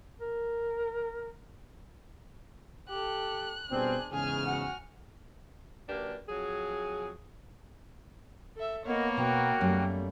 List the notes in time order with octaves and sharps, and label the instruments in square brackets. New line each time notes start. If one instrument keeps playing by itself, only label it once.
[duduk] A#4
[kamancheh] G4 A4 [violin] F#6
[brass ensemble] B2 G3 C4 [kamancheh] D4 G#4
[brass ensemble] E2 G#2 C#3 [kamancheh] G#4 [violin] G#5 F6
[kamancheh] F#4 F#5
[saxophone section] F#2 A#3 D4 G4 B4
F2 F#3 G#4
[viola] A4 E5
[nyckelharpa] A#3 [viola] B3 C#5 [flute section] A#4 D#5 F#5
[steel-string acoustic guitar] B2 A#5 [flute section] F#4 A#4 G5
[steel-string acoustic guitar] F#2 A3 [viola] G3